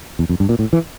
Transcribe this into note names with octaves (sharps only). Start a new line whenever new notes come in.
E2
F2
G2
A#2
A2
E3